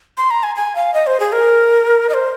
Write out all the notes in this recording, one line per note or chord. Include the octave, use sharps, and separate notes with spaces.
C6
A#5
G#5
G#5
F5
D#5
C5
G#4
A#4
D#5
C5